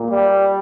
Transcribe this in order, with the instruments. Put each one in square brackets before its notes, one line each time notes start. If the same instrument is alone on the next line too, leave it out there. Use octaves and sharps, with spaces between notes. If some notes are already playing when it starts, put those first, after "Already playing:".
Already playing: [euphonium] A#2
[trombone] G3